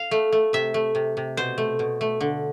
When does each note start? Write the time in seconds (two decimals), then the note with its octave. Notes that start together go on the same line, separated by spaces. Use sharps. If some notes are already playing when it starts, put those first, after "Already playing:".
Already playing: F5
0.11 A3
0.32 A3
0.53 C3 E5
0.74 A3
0.95 C3
1.17 C3
1.37 B2 C5
1.58 A3
1.79 B2
2.01 A3
2.21 D3